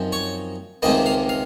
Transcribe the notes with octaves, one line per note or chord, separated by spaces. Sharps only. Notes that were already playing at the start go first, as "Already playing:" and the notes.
Already playing: F#2 F3 C4 D#4
C#5
C#2 C3 D#3 A#3 D#5
F5
F5